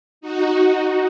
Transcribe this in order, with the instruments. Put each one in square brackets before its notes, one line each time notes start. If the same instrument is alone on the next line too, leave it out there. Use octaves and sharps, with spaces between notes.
[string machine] D#4 F#4